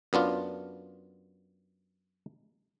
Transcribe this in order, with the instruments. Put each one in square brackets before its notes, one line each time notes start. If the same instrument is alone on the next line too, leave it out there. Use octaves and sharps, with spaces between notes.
[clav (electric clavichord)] F#2 B3 D4 F4